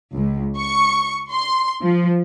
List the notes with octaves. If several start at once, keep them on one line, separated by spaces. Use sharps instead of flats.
C#2
C#6
C6
F3